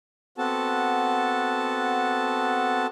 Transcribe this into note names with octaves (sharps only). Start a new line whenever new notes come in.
B3 C4 F#4 A4 A5